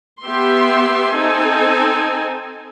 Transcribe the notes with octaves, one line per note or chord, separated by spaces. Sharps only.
B3 G4 E5 C6
C4 D#4 A4 G#5